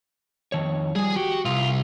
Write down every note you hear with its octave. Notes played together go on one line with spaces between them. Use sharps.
F2 D#3 C#5
F3 G3 G#4 G#5
F#4 G4
C2 F4